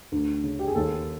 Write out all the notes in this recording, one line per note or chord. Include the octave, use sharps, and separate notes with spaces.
D2
C#3
G4
G#4
D#2 A4